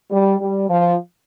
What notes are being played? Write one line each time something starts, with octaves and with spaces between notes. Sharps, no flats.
G3
G3
F3